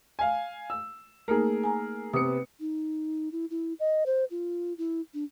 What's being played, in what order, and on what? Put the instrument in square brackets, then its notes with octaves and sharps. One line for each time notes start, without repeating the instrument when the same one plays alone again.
[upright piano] F5 G#5
E6
[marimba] A3 A#3 D#4 [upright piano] G#4 A#4
[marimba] G#5 A#5
[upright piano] C3 B3 C#7 [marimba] B4 D#6
[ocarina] D#4
E4
E4
D#5
C5
F4
E4
D4